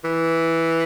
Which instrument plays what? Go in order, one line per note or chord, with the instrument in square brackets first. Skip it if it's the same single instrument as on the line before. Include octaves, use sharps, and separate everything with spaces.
[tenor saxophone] E3